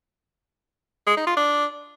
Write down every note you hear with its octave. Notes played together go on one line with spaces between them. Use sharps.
G#3
D#4
F4
D4